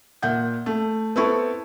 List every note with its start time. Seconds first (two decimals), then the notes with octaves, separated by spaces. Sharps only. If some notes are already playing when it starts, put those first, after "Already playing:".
0.22 A#2 E5 F#5 G6
0.66 A3
1.16 B3 C4 E4 A4 C#6